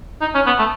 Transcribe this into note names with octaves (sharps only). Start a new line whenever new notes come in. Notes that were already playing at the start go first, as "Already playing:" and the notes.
D#4
C#4
B3
A3